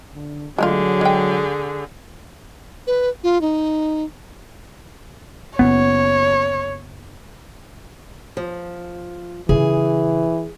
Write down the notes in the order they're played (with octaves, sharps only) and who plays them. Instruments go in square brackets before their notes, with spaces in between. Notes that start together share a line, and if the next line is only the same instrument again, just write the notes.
[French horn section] D3
[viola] D3 G#4 [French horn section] F#3 [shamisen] G#3 A3 F4
[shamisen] G#3 G5
[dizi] B4
F4
D#4
[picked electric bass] F#1 F2 B3 [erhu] C#5
[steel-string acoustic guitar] F3
[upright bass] C#3 F4 [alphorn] E3 [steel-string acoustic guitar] G#4